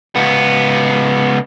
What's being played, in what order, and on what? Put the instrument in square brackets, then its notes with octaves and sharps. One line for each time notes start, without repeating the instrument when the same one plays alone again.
[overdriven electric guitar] C#2 B3